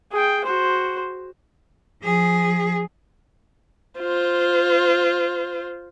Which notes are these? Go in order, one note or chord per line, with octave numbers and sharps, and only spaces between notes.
G#4 G5
F#4 C5
F3 G#4
F4 C5